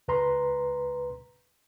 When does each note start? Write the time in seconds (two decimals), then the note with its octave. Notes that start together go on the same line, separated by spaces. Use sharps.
0.08 C#2 B4 A#5 C6